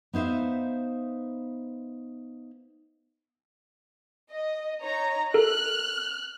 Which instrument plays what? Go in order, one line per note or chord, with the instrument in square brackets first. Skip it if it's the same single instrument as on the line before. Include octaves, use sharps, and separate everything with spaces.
[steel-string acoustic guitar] B3 D#4 C5 E5 F5
[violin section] D#5
D#4 C#5 A#5
[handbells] A4 A#4 [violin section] F6 F#6